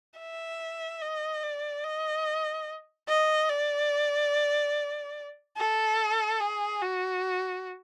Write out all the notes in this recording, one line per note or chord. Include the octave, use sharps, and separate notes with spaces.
E5
D#5
D5
D#5
D#5
D5
A4
G#4
F#4